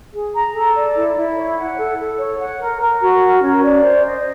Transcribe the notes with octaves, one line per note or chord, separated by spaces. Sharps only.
G#4
A#5
A4
D5
E4
E4
C#5
F#5
A4
A4
C#5
F#5
A#4
A#4
F#4
A#4
C#4
D5
C5
D#5